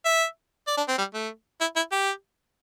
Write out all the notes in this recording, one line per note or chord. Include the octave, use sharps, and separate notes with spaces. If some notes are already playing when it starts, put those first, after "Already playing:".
E5
D5
D4
C4
G3
A3
E4
E4
G4